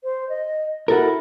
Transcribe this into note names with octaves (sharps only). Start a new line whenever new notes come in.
C5
D#5
E4 F#4 A4 A#4